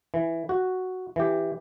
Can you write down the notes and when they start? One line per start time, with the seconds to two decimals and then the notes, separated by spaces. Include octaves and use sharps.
0.14 E3
0.49 F#4
1.16 E3 G4